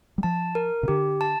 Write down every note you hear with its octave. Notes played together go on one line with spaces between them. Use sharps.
G3
F3 A5
A#4
C3
D3 G4
A5